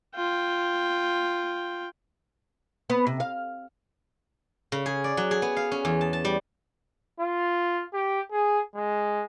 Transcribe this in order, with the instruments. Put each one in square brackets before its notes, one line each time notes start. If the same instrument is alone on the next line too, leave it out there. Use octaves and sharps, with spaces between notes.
[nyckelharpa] F4 G5
[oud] B3
C3
F5
[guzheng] C#3
G#4
D5
F#3
G#4
B3
F5
C#4
E2
A5
A5
G3
[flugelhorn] F4
G4
G#4
G#3